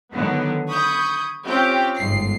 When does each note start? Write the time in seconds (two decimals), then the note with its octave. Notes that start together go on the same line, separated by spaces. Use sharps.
0.11 D3 D#3 F#3 B3
0.68 B5 C#6 D#6 G6 G#6
1.44 C4 C#4 F4 G4 G5
1.97 G1 G#2 C7